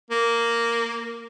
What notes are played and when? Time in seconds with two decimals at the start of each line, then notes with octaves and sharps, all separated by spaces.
0.10 A#3